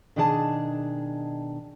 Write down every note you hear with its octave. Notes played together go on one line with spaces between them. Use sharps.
B2 D#3 D4 E4 G#4 A5